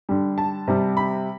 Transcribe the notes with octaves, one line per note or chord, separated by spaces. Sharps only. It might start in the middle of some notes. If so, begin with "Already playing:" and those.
D3 G3
A5
C3 G3
B5